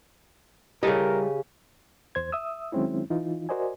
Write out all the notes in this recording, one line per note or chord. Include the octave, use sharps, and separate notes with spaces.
C#3 G3 E4 G4 A4 A#4 D#5
E2 C5 G#6
E5 D#6 E6
D#3 F#3 G#3 C4 C#4 E4
E3 D#4 F4
F#4 A#4 C5 D5 D#5 G#5